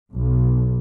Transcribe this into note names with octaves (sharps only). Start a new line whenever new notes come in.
B1